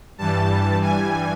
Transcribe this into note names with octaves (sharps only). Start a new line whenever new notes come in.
G2 E3 G3 A5
G#5